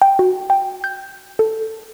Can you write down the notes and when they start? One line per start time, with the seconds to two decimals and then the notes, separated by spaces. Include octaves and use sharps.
0.02 G5
0.19 F#4
0.50 G5
0.84 G6
1.39 A4